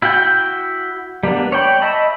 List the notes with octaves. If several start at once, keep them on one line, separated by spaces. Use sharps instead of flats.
E4 F#4 F#5 G5
G3 A#3 B3 D4
C#5 D5 G5 B5
D#5 E5 A5 B5